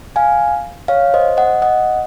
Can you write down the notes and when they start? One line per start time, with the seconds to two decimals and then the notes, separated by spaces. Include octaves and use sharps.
0.16 F5 G#5
0.88 C#5 F5
1.14 C5 D#5
1.37 D#5 F#5
1.62 D#5 F#5